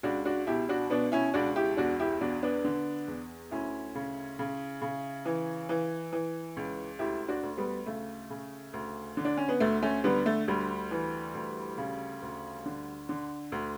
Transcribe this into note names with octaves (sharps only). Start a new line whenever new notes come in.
C#2 D4 F#4
D4 F#4
B2 E4 G4
D4 F#4
B2 B3 D4
C#4 E4
C#2 D4 F#4
E4 G4
E2 D4 F#4
E4 G4
E2 D4 F#4
B3 D4
D3
E2
D2 C#4 E4
C#3
C#3
C#3
E3
E3
E3
C#2
D2 E4 G4
D4 F#4
D2
G3 B3
C#3 A3
C#3
D2
D3
D4
C#4
B3
D2 A3
A3 C#4
D3 G3 B3
A3
D2 G3
E3
D2
C#3
D2
D3
D3
D2